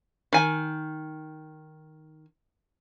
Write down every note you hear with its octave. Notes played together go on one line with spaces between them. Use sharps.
D#3 G#5